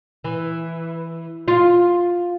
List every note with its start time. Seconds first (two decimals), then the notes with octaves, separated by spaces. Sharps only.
0.24 E3
1.48 F4